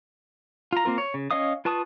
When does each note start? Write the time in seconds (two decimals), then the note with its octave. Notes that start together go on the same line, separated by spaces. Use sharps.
0.73 F4 A#5
0.85 A#3 C4 F4 A#4
0.98 C#5
1.14 C#3
1.31 C#4 C#5 D#5 F5 D#6
1.65 F4 B4 A5 C#6 D#6